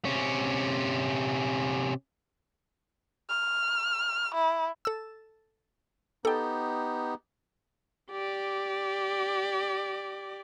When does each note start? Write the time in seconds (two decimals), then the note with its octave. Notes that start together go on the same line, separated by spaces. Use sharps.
0.05 C3 C#4
3.29 F6
4.34 E4
4.85 A4 E6
6.25 B3 D#4 G4 A4 G5
8.11 G4 D5